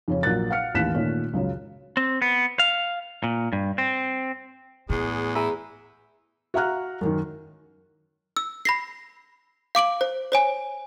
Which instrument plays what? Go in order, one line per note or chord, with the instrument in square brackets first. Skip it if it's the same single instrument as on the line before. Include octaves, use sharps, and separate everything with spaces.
[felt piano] F2 C#3 C#4
A#1 F#3 A#4 F#6 A6
F5 F#5 F6 C#7
A1 D#2 E3 F#6 B6 E7
A#2 D#3 A3 C#4
C#2 F#2 C#3
[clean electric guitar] C4
B3
F5
A#2
G2
C4
[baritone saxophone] E2 [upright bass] A2 [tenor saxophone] G#3
[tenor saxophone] E4 [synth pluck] G#4 A#5
[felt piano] F#4 E5 F5 A#5 F6 F#6
F#2 D#3
[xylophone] E6
B5 A#6 C7
F5 D6 D7 F#7
C5
C5 C#5 G#5